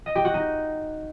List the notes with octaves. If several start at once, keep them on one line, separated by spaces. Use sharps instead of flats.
D#5
G4
F#4
D#4